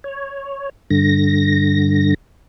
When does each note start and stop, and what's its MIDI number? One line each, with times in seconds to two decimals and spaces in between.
0.04 0.69 73
0.90 2.14 43
0.90 2.14 50
0.90 2.14 94